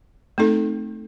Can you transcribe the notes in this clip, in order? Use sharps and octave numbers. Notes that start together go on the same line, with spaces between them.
A3 C4 D#4 A4